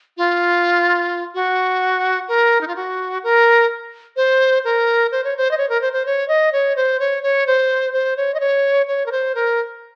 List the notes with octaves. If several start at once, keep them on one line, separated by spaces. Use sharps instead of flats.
F4
F#4
A#4
D#4
F4
F#4
A#4
C5
A#4
C5
C#5
C5
D#5
C#5
A#4
C5
C5
C#5
D#5
C#5
C5
C#5
C#5
C5
C5
C#5
D#5
C#5
C#5
A#4
C5
A#4